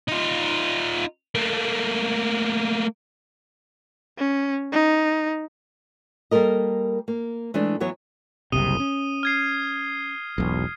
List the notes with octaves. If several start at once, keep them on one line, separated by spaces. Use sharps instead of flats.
D#4 F4
A3 A#3
C#4
D#4
G3 A#3 A4 A#4 D#5
A#3
E3 G#3 A3 D4
E3 F#3 B3 C#5
F#1 C2 C3 D#6 D#7 G7
C#4
F6 G#6 C7
E1 B1